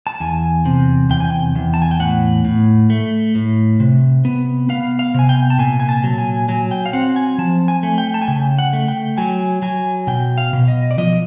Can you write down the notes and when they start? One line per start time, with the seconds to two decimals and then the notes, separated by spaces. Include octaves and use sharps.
0.07 A5
0.20 E2 G#5
0.65 C3
1.10 E2 G5
1.20 G#5
1.30 G5
1.55 E2
1.74 A5
1.82 G#5
1.91 G5
2.00 A2 F#5
2.45 A2
2.90 A3
3.35 A2
3.80 C3
4.25 B3
4.69 B3 F5
4.99 F5
5.14 C3 G#5
5.29 G5
5.50 A5
5.58 A#2 G#5
5.80 G#5
5.89 A5
6.04 F#3
6.18 G#5
6.49 F#3 G#5
6.71 G5
6.86 F5
6.93 C4 F#5
7.16 G#5
7.38 F3 A5
7.68 G#5
7.83 A3
7.98 G5
8.14 A5
8.22 G#5
8.28 C#3 G5
8.59 F#5
8.73 A3
8.88 G5
9.18 F#3 G#5
9.62 F#3 G#5
10.07 B2 G5
10.38 F5
10.53 B2
10.68 D#5
10.91 D5
10.98 F3 D#5